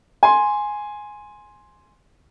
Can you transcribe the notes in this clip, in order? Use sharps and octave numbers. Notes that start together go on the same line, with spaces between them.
G#5 C6